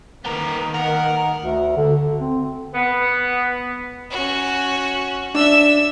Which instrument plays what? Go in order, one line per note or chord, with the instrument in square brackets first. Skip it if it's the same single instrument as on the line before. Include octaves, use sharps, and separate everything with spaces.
[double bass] D#3 A#3 [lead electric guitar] B3 A#4 [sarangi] B4
[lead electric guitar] A#4 [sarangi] F#5
[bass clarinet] D2
D3
D3
C4
[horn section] B3
[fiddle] C#4 F#4
[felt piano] D4 [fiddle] E5 E6